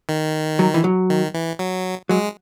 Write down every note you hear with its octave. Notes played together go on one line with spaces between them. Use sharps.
D#3
F#3
E3
F#3
D#3
E3
F#3
F#3 G#3